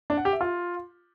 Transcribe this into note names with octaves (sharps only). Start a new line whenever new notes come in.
D4
F#5
G4
E5
F4